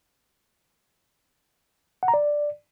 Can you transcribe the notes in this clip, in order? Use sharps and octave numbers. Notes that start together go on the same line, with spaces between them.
F#5
A#5
D5